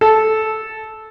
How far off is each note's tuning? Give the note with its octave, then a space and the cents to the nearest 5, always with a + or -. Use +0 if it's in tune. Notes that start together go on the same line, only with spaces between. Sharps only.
A4 -10